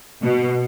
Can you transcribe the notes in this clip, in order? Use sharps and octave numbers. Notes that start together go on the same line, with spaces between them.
B2